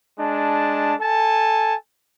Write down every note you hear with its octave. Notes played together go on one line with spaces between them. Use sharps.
G#3 D4 A5
A4 G#5 A5